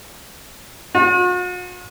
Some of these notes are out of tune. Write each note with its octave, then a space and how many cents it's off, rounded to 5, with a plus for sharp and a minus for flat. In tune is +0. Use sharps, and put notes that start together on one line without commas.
F#4 -45